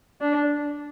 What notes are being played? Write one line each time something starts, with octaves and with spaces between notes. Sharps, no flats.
D4